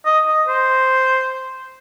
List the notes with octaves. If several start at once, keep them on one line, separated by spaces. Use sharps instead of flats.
D#5
D#5
C5